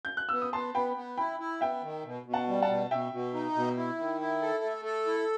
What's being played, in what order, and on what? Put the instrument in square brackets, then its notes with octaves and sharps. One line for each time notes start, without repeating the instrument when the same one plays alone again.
[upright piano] G6
F#6
[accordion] B3 [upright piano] E6
[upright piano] D#6
[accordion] B3 [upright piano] A5 C6
[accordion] B3 [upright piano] G5 B5
[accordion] B3
[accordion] E4 [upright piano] G5 B5
[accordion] E4
[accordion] B3 [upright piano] E5 G5
[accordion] D#3
B2
B2
[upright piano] F#5 A5
[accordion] G3
[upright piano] F#5 A5
[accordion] B2
[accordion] B2 [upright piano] E5 G5
[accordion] B2
D#4
B2
E4
D#3
E4
A4
A3
A4
E4